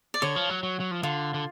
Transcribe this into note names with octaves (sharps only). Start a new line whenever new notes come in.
D5
D3 C#5
F3
F#3
F#3
F#3
F3
D3 F4
D3